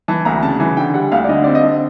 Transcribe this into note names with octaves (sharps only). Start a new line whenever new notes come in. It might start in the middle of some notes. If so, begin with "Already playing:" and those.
E3 A5
D2 A#5
C#3 A5
E3 G#5
D3 G5
G3 F#5
D2 F5
D5
D3 D#5
C4 D5
D#5
D3